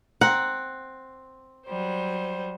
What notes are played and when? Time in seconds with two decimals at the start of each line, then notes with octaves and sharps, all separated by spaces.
0.21 C4 F#5 A#5
1.67 F#3 G3 C5